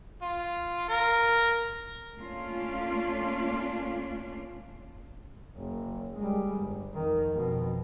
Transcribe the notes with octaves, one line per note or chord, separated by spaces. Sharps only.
F4
A#4
A3 A#3 C#4 D4 F4
F#1
G3 G#3
G1
F2 D#3
F2 B2